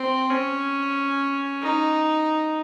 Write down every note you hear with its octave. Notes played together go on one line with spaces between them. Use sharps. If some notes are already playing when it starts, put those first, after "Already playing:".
Already playing: C4
C#4
D#4